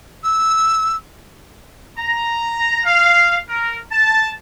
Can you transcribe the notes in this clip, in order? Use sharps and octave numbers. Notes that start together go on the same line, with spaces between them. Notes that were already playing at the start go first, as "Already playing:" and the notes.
E6
A#5
F5
A#4
A5